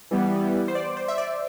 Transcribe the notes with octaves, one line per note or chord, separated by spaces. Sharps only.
E3 G3 B3
C5
D5
C5
E5
D5